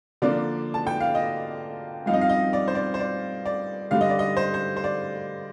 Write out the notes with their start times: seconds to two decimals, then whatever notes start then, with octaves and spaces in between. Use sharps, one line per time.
0.22 D3 F3 A#3 D4 D5
0.74 A5
0.87 G5
1.00 F5
1.15 D#5
2.06 G2 F3 C4 D#4 F5
2.13 D#5
2.21 F5
2.29 D#5
2.53 D5
2.68 C5
2.75 D5
2.94 C5
2.99 D5
3.46 D5
3.91 G2 D3 G3 F5
4.01 D#5
4.09 D5
4.19 D#5
4.37 C5
4.54 C5
4.76 C5
4.84 D5